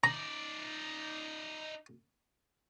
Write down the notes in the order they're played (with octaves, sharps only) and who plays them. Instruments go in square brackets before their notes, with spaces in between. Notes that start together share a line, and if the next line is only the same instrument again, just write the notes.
[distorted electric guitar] D#4 D5 [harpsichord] A#5